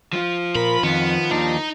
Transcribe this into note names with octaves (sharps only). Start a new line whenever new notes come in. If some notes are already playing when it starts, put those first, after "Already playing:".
F3 F4
A#2 A#4 B5
F2 D#3 B3
D#2 D4 D#4